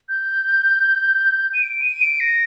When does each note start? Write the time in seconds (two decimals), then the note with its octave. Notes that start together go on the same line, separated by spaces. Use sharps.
0.09 G6
1.54 D#7
1.62 D7
1.82 D#7
2.02 D7
2.20 A#6